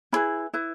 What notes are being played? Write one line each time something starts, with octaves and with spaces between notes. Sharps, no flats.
C#4 E4 G#4 B4 B5
E4 B4